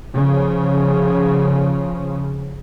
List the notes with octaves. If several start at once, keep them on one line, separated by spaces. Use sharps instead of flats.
C#3 F3